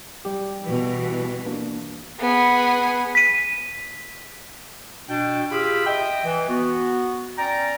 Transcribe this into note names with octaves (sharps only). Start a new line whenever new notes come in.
G3 G4
B2 E3
A#3 D4
B3 G#4
B6 D#7
B2 D4 G5
F4 G4 G#4 F5 B5 E6
D#5 E5 G5
E3
B3 F#4
C#4 D5 G5 A#5